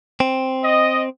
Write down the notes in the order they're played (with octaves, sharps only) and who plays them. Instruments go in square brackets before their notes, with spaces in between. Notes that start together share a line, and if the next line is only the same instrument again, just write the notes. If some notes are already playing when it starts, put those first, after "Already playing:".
[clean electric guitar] C4
[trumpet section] D#5